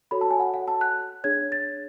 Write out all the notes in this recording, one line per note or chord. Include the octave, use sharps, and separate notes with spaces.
F#4 A4 C#5 B5
A5
G#5
F#5
F#5
A5
F#6
D4 G#4 C#5 G#6
A6